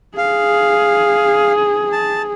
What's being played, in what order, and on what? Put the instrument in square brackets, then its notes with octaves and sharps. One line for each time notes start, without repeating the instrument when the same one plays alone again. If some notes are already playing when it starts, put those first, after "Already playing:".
[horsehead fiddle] G#4 [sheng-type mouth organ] F5
[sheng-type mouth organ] A5